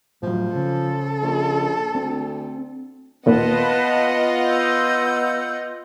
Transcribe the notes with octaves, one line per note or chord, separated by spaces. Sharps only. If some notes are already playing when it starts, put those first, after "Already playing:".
A2 F3 F#3
C#3 A4
A#1
D2 C4
D#2 A#2 B3 F4 B4 D#5 F#5 A5
E6 G6